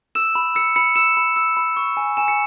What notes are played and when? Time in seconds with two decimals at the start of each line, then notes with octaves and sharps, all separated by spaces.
0.15 E6 E7
0.35 B5
0.55 E6 C#7
0.76 B5 C#7
0.96 E6 E7
1.17 B5
1.36 E6
1.57 B5
1.77 C#6
1.97 G#5
2.17 G#5 E7
2.28 C#7